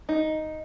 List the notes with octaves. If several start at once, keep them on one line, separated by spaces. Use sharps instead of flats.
D#4